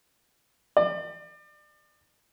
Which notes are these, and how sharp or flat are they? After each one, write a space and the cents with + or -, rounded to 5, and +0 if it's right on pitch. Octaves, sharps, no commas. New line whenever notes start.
D5 +35